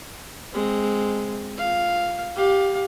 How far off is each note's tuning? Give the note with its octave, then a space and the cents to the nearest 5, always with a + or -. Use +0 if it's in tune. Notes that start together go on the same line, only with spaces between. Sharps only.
G#3 +0 C4 +0
F4 +0 F5 +0
G4 +0 F5 +25